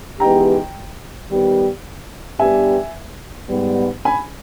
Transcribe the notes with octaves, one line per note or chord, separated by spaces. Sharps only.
E3 G#3 B3 D#4 G4 G5 A#5
D#3 G3 B3 G4
G2 G3 B3 G4 E5 G#5
G#2 G3 B3
G#5 B5